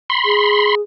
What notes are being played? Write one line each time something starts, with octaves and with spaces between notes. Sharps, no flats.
B5 C6
G#4